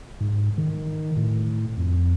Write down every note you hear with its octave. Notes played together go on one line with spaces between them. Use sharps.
G#2
D#3
A2
F2